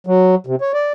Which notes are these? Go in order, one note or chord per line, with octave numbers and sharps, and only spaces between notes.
F#3
C3
C#5
D5